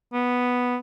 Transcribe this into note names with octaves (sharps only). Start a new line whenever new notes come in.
B3